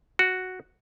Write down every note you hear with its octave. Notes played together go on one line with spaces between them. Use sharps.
F#4